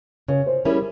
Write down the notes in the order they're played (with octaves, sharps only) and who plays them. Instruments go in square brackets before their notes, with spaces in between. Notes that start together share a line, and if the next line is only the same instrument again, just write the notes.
[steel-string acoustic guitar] C#3 [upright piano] C#5
[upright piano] C5
[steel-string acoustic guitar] G3 C#4 E4 G#4 [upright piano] A#4